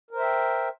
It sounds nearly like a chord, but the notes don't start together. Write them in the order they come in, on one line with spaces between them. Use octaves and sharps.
A#4 C5 E5 G5